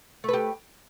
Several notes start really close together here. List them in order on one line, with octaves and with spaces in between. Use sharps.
A3 B4 G4